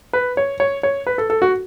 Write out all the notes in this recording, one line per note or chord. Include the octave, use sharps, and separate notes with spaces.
B4
C#5
C#5
C#5
B4
A4
A4
F#4